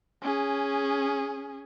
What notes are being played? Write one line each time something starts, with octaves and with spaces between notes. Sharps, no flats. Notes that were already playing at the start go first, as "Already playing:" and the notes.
C#4 G#4